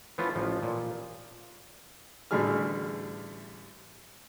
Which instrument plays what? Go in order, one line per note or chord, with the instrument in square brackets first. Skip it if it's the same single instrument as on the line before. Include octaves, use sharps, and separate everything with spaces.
[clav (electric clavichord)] E3 F3 A3 B3 C#4 F4
A1 F3
A#2
[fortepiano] A1 D3 G3 A3 G#4 F6